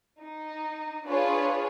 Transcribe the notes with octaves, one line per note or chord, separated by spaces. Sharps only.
D#4
D4 F4 G#4 B4 C#5